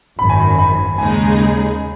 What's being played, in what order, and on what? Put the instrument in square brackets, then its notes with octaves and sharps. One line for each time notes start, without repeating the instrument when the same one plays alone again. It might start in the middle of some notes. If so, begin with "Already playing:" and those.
[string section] G#1 F#2 D#3 [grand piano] B5
[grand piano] G#5
B5
B5
[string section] D#2 C#3 G#3 D#4 G#4 [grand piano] G#5